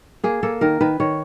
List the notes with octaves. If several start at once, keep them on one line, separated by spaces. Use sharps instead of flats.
A#3 G#4
A#3 A4
D#3 A#4
D#3 B4
D#3 C#5